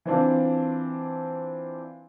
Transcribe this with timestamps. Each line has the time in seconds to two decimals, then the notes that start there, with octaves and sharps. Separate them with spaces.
0.06 E3 C4 D4 F4